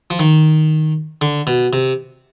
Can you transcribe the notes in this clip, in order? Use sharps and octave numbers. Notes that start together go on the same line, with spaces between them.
F3
D#3
D3
B2
C3